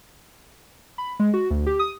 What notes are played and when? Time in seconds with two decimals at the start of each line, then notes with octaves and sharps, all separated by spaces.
0.98 B5
1.20 G#3
1.34 F#4
1.50 D2
1.66 G4
1.79 D#6